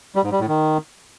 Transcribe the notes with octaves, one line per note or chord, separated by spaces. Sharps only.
G3
G#2
G3
A2
D#3